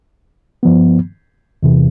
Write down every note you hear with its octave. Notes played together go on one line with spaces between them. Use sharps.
G2 F3 B3
E2 C3 E3